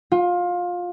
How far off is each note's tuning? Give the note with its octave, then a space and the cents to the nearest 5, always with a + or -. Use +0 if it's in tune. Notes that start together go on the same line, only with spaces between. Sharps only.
F4 +20